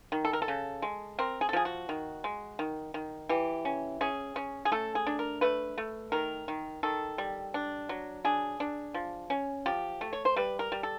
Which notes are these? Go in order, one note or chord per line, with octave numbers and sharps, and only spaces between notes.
D#3
A4
A#4
A4
C#3
G#3
C4 A#4
G#4
A4
F3 G#4
F#4
D#3
G#3
D#3
D#3
E3 G4
C#4
C#4 G#4
C#4
G#4
A3 A4
G#4
D4
A#4
A3 B4
A3
D#3 A#4
D#3
D#3 A4
G3
D4
F#3
D4 G#4
D4
F3
C#4
F3 G4
A3
C#5
C5
G3 B4
A#4
G3
A4